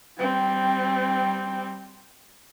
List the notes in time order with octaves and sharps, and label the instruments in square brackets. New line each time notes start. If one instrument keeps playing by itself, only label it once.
[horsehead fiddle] G3 C4